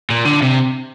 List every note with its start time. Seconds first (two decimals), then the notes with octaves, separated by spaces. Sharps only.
0.10 A#2
0.25 D3
0.42 C3